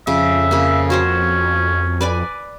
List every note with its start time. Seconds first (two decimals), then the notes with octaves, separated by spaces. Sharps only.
0.07 F2 C#3 E5
0.51 C#3 A#3
0.90 C#4 F#4 C5 C#5
2.01 B4 D5 G#5